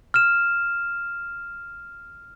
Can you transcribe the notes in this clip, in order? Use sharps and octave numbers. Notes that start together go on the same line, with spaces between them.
F6 E7